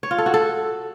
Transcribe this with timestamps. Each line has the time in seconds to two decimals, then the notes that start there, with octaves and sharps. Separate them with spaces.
0.03 C#5
0.11 F4
0.18 A4
0.26 F#4
0.34 A4